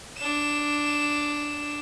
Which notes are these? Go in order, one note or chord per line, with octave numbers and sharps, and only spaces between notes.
D4 E7